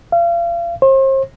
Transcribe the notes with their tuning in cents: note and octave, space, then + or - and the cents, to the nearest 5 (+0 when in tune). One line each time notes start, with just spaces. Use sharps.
F5 -35
C5 +40